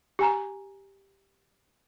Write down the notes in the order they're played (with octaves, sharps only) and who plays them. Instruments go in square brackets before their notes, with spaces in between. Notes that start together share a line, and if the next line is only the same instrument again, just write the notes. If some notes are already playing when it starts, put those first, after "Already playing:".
[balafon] G4 G#5 A#5